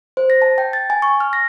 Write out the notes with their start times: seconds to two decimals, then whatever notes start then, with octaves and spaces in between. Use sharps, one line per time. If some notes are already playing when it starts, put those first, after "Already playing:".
0.17 C5
0.30 A#6
0.42 A5
0.58 G5
0.73 A6
0.90 G#5
1.02 C#6
1.20 F6
1.33 A#6